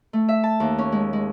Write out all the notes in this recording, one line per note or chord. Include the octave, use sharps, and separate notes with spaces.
A3
E5
A5
D#2
C#4
G#3
G#3